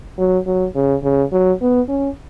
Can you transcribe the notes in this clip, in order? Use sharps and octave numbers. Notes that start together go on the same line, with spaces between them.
F#3
F#3
C#3
C#3
F#3
B3
C#4